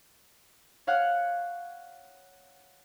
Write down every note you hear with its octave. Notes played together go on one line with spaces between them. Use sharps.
C#5 F5 F#5 F#6